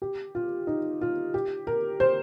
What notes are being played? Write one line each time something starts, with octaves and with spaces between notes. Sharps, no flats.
G4
F4
D#4
F4
G4
A#4
C5